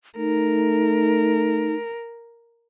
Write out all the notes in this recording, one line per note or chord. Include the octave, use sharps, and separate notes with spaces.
A3 D#4 A#4